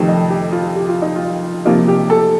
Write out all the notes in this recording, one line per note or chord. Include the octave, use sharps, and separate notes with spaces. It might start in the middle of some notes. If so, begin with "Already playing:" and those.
Already playing: F2 C3 D#3 A3 D#4
D#5
G4
F4
G4
F4
D#4
F4
C3 F3 A#3 D#4 F4
G4
A4